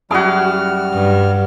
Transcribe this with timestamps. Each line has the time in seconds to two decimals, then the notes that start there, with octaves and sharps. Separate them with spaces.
0.11 F#2 G3 E4 F#4 G#4 D6 F6
0.94 G2